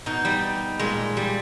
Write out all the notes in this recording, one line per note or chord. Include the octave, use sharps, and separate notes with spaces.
B2 D#4
G3
A#2 G#3
G3